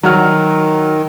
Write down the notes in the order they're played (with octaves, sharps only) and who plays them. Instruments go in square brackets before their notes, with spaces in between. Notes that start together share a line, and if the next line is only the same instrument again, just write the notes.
[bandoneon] D#3 [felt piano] F#3 F#4 F6